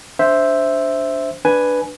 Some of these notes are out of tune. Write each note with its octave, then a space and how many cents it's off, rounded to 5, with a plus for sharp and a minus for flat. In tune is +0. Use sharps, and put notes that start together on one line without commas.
D4 -15 C5 +0 E5 +0
D4 +0 B4 +0 G#5 +5